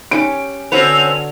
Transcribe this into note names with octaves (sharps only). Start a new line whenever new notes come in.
C#4 G4 D7
D3 C4 C#4 F#4 B4 A#5 F7